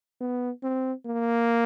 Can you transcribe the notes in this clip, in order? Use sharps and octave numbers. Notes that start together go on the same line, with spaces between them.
B3
C4
A#3